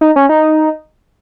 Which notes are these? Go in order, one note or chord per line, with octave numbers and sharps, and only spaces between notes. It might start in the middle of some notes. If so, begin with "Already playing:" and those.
D#4
C#4
D#4